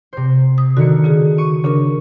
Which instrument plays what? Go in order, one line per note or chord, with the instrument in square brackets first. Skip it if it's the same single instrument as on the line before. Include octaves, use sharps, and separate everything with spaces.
[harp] C3 C5
[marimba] D#6
[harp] D3 D#3 C#7 [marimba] F#4
[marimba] C#3 F#4 G#4
[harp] C#6 D#7
[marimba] C#3 D4 A#4